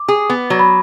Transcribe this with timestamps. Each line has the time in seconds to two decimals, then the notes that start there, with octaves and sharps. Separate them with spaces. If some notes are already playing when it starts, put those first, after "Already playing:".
Already playing: D6
0.08 G#4
0.30 B3
0.50 F#3
0.59 B5